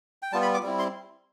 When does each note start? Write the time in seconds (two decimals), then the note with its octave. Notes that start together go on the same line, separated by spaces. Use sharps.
0.22 G5
0.32 G3 B3 F4 A5
0.42 B5
0.54 D6
0.63 G3 C4 E4
0.79 C6